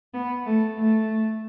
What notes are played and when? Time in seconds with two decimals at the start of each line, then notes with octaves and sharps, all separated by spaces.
0.14 B3
0.46 A3
0.78 A3